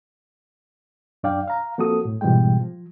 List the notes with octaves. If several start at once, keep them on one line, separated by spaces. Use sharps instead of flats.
F#2 D4 D5 F5 G5
F5 A#5
F3 A#3 C4 F#4 A4 D#6
A2
G#2 B2 E3 G3 G#3 G5
F3